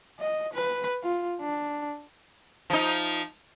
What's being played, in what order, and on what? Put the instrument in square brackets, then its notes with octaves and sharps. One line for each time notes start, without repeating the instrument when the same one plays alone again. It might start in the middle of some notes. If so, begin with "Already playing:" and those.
[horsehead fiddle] D#5
B4
F4
D4
[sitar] F3 D#4